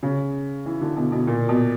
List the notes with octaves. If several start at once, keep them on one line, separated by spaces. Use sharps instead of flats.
C#3
E3
D3
B2
B2
A#2
B2